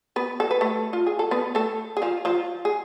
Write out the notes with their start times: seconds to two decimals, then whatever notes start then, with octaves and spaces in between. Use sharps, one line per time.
0.16 B3 B4
0.40 A4
0.51 B4
0.61 A3 A4
0.93 F4
1.07 G#4
1.19 A4
1.31 B3 B4
1.55 A3 A4
1.97 G#4
2.02 F3 F4
2.25 F3 F4
2.65 G#4